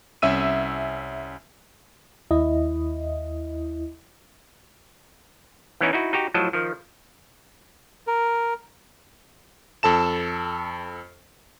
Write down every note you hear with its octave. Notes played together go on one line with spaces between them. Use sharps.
C2 C#4 E5 E6 D#7
D#2 E4 D#5
E3 B3 C#4 D#4 E4
D#4 E4 F#4
D#4 F#4 G4
A2 F3 F#3 D#5 A5
D#3 F3
A#4
F2 A4 A5 E7